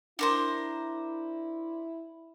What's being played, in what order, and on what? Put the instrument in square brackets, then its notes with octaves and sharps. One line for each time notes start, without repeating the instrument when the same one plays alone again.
[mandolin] D4 A#4 C5 [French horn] E4